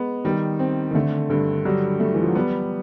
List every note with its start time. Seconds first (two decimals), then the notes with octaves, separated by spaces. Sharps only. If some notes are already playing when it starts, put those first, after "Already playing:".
Already playing: G#3 B3
0.24 D#3 G3
0.59 C4
0.91 D#3
0.95 D3 A3
1.30 G2 D3
1.65 F#3 G3
2.00 A3
2.14 E3
2.21 F3
2.28 F#3
2.35 G3 B3